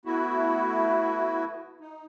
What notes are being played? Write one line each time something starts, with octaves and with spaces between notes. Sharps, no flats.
A3 B3 E4 F#4
D#4